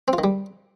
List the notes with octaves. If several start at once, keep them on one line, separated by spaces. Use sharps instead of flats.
C4
F4
D#3
G3